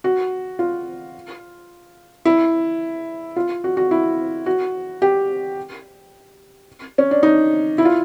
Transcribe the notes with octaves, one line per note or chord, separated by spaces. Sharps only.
F#4
F4
E4
F4
F#4
F#4
E4
F#4
G4
C#4
D4
D#4
E4
F4